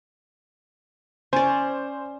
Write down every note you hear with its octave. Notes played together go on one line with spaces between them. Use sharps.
C#4 C5 D5